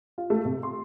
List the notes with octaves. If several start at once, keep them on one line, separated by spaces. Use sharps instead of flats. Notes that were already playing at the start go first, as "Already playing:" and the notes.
F4
A3
C3
C6